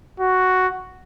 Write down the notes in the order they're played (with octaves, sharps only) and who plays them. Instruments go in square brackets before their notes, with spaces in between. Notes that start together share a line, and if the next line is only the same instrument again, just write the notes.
[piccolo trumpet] F#4